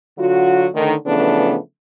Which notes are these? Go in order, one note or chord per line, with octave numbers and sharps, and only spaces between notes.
D3 F#3 F4 F#4
A2 D3 D#3
C#3 E3 F3 A3 B3 D4